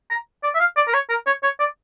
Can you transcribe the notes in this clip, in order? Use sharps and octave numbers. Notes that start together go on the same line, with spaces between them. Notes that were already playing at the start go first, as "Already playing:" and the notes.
A#5
D5
E5
F5
D5
A#4
C#5
A#4
C#5
C#5
D5